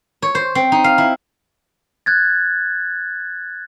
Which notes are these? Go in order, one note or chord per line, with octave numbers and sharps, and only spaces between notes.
C#5
C5
C4
D#4
F5
E4
F#6 G#6 A6